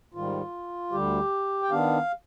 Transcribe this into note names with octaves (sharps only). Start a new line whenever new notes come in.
G#2 D#3 G3 F4
D2 D3 G3 G4
G5
D#3 B3 D4 F5